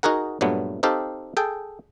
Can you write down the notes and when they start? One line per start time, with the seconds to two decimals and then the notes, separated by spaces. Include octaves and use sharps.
0.03 D#4 F#4 G#4 A#4 F#5
0.41 G2 A#2 F#3 A3 B3
0.83 C4 D#4 G4 A4 F5
1.37 G#4 A4 G5